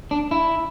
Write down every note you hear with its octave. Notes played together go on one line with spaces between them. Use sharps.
D4
E4